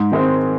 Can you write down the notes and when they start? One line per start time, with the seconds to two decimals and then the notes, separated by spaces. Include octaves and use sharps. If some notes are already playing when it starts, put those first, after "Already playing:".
Already playing: G#2
0.12 D#3 G#3 C4